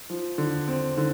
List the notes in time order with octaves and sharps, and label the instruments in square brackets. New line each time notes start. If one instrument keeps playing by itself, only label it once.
[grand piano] F3
D3
C4
D3